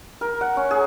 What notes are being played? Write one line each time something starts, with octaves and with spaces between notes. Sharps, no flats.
A#4
F#5
C#4
G#4